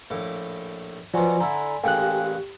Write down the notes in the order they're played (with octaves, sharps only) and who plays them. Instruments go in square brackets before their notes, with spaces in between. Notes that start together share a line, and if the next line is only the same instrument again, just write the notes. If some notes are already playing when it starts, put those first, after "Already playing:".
[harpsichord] A#1 A2 D6
[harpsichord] B2 F#3 [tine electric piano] F3 [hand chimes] D5 G#5 C6
[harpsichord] D3 E4 [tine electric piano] A#5
[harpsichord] A1 A#2 G#3 [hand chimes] A4 G5 G#5 [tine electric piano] F5 F#6
[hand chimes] G4